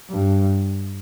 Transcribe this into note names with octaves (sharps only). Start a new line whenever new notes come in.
G2